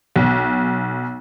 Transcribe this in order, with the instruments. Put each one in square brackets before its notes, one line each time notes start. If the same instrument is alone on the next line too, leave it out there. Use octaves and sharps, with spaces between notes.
[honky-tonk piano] B1